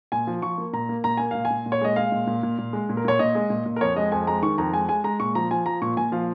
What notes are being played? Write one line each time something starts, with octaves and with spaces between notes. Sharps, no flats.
A#2 G#5
F3
F3 C#6
A#3
A#2 A#5
A#3
A#2 A#5
A#3 G#5
A#2 F5
G#5
A#2
A#2
C#5
G#3 D#5
G#3 F5
A#2
A#2
A#2
A#2
G#3
A#2
A#4
A#2 C#5
A#2 D#5
G#3
A#2
A#2
A#4
F2 C#5
G#3 D#5
F2 G#5
G#3 A#5
D#3 C#6
F2 A#5
G#3 G#5
G#3 G#5
G#3 A#5
A#2 C#6
F3 A#5
F3 G#5
F3 A#5
A#2 C#6
A#2 G#5
F3 F5